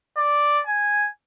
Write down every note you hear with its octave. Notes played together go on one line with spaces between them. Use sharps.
D5
G#5